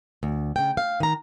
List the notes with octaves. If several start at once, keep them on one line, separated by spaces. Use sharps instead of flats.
D2
C#3 G5
F5
D#3 A#5